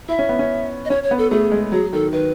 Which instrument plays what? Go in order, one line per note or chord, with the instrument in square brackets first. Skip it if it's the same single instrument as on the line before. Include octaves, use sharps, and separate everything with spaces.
[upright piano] E4 [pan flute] E5
[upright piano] C#4
B3
C#4
[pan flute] D#5
[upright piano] C#4 [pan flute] C#5
[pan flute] C#5
[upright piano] B3
[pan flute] A4
[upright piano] A3 [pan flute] G#4
[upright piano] G#3
[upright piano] F#3 [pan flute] G#4
[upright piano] D#3 [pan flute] A4
[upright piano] D#3 [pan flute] B4